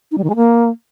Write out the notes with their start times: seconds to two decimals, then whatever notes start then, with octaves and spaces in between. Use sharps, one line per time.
0.11 D#4
0.18 G3
0.24 D#3
0.30 G#3
0.36 A#3